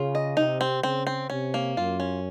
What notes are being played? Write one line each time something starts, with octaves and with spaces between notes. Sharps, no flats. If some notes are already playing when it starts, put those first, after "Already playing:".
Already playing: C#3 F4
D#5
C3 D#4
C4
C#3 C4
C4
C3 C#4
A#3
F#2 F4
C#4